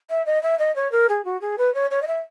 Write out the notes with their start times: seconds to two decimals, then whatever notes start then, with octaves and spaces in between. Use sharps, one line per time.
0.10 E5
0.26 D#5
0.43 E5
0.59 D#5
0.76 C#5
0.92 A#4
1.09 G#4
1.25 F#4
1.41 G#4
1.58 B4
1.74 C#5
1.90 C#5
2.02 D#5
2.07 E5